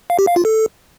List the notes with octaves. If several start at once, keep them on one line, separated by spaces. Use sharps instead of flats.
F5
G4
F5
F4
A4